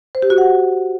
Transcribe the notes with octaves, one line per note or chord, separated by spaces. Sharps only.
C5
G4
F#4
F#5